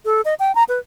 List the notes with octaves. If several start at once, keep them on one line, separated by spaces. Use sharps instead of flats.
A4
D#5
G5
A#5
B4